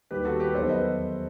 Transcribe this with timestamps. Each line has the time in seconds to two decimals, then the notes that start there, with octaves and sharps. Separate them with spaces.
0.11 D#2 D#3 G3 G4 B4
0.25 F#4 A4
0.40 G4 B4
0.54 E2 D#3 F#3 A3 A4 C5
0.69 B4 D#5